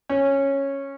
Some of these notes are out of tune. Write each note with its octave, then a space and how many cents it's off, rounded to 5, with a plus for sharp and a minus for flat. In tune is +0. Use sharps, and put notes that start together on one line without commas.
C#4 -10